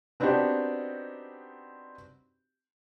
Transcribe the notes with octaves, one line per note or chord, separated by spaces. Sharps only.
B3 C4 D4 D#4 F#4 G4